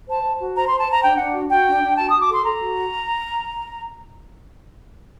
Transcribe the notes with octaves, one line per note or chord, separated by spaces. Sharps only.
C5 A5
C5
F#4
C5 A#5
C5 C6
A5
C5 A#5
D4 G5
D4 F#5
F#4
F#4 G5
D4
D4
F#4 A5
F#4 D#6
D6
A4 C6
A4 A#5
F#4